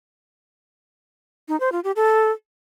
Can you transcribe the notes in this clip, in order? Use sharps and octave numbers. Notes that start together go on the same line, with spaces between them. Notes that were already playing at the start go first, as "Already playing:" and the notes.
D#4
C5
F4
G4
A4